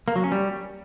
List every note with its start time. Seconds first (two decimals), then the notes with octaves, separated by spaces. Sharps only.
0.08 A#3
0.16 F#3
0.24 C#4
0.32 G3